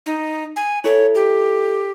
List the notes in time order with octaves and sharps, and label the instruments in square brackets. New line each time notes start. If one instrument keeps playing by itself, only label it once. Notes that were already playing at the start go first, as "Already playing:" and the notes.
[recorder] D#4
G#5
[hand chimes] E4 A4 [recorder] C#5
[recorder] G4